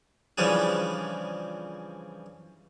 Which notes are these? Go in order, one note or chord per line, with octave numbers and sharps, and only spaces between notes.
C#3 E3 F3 G3 D4 G#4